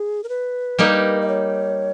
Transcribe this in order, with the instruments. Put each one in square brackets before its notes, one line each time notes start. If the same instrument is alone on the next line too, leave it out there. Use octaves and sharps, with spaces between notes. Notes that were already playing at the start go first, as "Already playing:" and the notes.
Already playing: [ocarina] G#4
A#4
B4
[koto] G3 A#3 D#4 G4
[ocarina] D#5
C#5